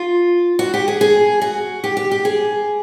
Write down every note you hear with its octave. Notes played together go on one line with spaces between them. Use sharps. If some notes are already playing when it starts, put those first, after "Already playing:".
Already playing: F4
F#4
G4
G#4
G#4
F#4
G4
G4
G4
G#4